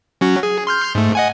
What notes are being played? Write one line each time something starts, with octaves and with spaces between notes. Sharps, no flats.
F#3 C#4 F#4
G#4
C6 F6 G6
G#2 A3
D#5 F#5 G#5